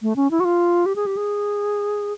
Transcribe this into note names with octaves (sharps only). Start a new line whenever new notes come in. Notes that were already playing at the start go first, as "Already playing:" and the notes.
A3
C#4
E4
F#4
F4
G4
G#4
G4
G#4